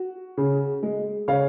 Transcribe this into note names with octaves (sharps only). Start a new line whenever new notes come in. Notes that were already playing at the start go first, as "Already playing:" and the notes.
Already playing: F#4
C#3
G#3
C#3 C#5 F5